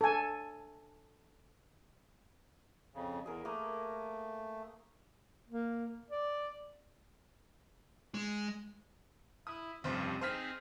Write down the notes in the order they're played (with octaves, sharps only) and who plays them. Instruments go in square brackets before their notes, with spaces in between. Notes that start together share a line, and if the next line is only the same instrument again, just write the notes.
[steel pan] A4 G#5
[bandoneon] F2 C#3
[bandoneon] E2 [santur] G#4 A#4
[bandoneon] A3 [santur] A#3 D#6
[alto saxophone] A#3
D5
[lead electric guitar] G#3
[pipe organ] E4 [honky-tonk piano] D#6
[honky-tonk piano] F1 C5 [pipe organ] G2 C#3 F3
[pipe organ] C4 D#4 G#4 [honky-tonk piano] C5 F6 B6